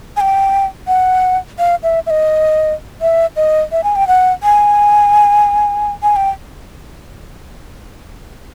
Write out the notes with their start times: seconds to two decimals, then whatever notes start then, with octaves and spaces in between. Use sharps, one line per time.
0.16 G#5
0.20 G5
0.87 F#5
1.59 F5
1.83 E5
2.06 E5
2.10 D#5
3.01 E5
3.36 D#5
3.72 E5
3.83 G#5
3.96 G5
4.07 F#5
4.43 G#5
6.03 G#5
6.16 G5